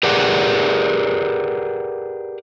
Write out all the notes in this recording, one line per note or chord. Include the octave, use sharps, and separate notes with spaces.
G4 G#4 A#4 B4 D5 F#5